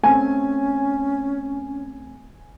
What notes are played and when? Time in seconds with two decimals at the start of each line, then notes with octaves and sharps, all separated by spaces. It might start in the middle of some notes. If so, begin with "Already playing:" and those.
0.04 A3 C4 C#4 G#5